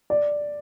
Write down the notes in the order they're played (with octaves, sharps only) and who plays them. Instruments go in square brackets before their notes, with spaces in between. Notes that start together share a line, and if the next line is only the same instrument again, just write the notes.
[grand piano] D5